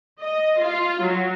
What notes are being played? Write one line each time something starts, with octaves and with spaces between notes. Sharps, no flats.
D#5
F4
F#3